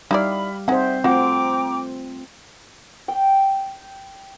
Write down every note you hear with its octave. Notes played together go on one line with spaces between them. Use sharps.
G3 D#4 E4 G4 D5 F5 B5
C4 D#4 G#4 C5 D5 E5 F#5
A3 C4 F4 F#4 F#5 G5 A#5 D6
G5